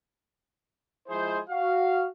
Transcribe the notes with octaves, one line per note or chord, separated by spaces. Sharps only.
F3 G#3 E4 G#4 C5
F#4 F5